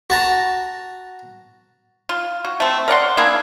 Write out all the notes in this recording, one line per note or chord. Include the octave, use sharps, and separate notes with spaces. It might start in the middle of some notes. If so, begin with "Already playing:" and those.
F#4 A5 A#5
F4
F#4
A3 C4
A#4 D5 F#5 C6
A#3 D4 E4 G#4